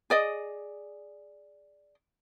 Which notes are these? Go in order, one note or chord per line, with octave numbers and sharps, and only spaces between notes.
G#4 D5 D#5